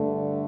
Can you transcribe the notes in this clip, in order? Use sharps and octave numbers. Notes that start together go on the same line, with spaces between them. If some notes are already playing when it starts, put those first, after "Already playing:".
Already playing: G2 D3 A3